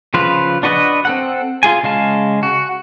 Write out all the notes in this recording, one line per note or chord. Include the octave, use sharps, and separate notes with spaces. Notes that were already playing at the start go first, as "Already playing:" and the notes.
C#3 F3 F4 B4
D4 F#4 B4 D#5 F#5
C4 A4 F#5
F4 G#4 G#5
C#3 G#3 F5 A5
F#4